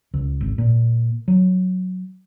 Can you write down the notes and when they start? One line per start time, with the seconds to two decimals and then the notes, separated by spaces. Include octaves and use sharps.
0.14 C#2
0.41 G#1
0.58 A#2
1.28 F#3